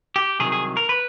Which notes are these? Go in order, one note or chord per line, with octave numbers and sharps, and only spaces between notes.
G4
C2 C3 D#3 F#3 G#4
G#4
A#4
B4